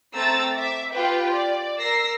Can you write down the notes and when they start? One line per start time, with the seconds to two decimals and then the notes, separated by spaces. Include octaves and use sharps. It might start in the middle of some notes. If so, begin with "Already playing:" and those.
0.15 A3 C4 A#5 E6 A6
0.55 E5 D6
0.91 F4 G4 B4 G5
1.33 D5
1.79 A#4 E6 A#6 C7